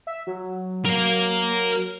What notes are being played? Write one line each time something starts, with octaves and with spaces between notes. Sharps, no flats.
E5
F#3
A#4 F5